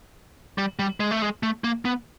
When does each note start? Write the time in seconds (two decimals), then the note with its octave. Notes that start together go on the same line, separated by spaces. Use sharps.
0.58 G3
0.79 G3
1.00 G#3
1.11 A3
1.22 G#3
1.43 A3
1.64 A#3
1.85 B3